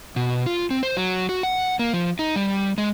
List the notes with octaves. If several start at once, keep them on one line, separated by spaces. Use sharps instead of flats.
B2
F4
C4
C5
F#3
F#4
F#5
A#3
F3
D#4
G3
G#3